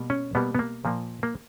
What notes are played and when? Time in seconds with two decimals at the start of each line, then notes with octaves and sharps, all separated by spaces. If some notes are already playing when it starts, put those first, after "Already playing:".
Already playing: B2 G3 A#3
0.10 C#4
0.35 B2 G3 A#3 B3
0.55 B3
0.59 A#3
0.85 A#2 F3 A#3
1.23 A#3